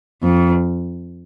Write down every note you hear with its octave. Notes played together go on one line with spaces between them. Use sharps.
F2